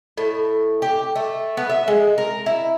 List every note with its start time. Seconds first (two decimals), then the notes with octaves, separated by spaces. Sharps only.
0.18 A2
0.82 G4
1.15 A3
1.57 B3
1.69 E5
1.88 G#3
2.18 A#4
2.46 E4